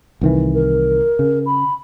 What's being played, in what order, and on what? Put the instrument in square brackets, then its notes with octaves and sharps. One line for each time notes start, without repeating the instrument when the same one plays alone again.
[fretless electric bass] C2 D#3 E3
[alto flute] A#4
[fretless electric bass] C#3
[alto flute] B5